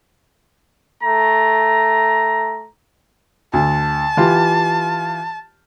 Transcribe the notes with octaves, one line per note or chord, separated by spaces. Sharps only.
A3 A#5
D2 A5
E3 F4 G4